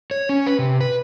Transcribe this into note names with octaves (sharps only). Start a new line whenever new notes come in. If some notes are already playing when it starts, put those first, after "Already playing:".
C#5
C#4
B4
C3
B4